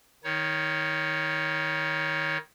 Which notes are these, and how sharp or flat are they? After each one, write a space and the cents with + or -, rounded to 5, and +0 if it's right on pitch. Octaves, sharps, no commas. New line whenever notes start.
D#3 +0 D#4 +35 C#5 +10